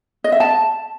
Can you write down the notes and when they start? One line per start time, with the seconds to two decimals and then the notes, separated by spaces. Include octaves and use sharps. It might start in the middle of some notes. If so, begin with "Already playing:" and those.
0.24 D#5
0.32 E5
0.40 A5